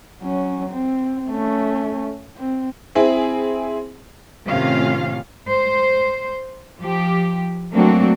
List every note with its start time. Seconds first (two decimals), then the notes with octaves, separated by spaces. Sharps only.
0.22 F#3 C#4
0.70 C4
1.30 A3 C#4
2.37 C4
2.95 C4 E4 G#4
4.46 A2 C3 D#3 C#4 F4 F5
5.49 C5
6.78 F3 G4
7.72 F#3 A3 A#3 C4 D4 F#4